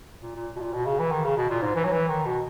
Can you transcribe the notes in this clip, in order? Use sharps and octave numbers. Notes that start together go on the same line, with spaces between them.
A#2
A#2
B2
A#2
B2
C#3
E3
D#3
C#3
B2
A#2
G#2
E3
F#3
E3
D#3
B2